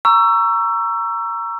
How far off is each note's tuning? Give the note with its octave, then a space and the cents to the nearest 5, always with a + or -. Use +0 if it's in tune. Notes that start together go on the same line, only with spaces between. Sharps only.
A#5 +0 C#6 +15 E6 +25